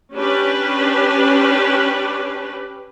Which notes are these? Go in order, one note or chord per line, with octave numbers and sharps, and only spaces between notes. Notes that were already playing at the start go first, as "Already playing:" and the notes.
C#4 D4 G4 B4